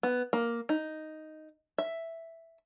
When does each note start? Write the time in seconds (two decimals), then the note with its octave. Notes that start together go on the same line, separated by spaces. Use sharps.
0.03 B3
0.33 A#3
0.69 D#4
1.78 E5